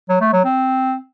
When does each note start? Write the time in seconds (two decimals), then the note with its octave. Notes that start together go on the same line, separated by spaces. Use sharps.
0.09 F#3
0.21 A3
0.33 F#3
0.45 C4